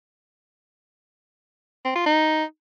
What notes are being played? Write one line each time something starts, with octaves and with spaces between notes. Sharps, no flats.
C4
F4
D#4